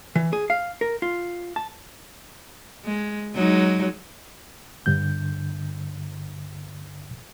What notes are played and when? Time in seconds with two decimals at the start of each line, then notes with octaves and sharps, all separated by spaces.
0.16 E3
0.33 G#4
0.50 F5
0.81 A#4
1.02 F4
1.56 A5
2.85 G#3
3.35 F#3 G#3 D#4
4.86 G2 D3 G6